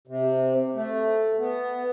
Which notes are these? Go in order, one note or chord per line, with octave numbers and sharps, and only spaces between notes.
C3
A3
B3